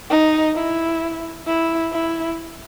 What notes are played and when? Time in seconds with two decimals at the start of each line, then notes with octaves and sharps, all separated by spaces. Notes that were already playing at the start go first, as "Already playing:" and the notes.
0.10 D#4
0.56 E4
1.47 E4
1.92 E4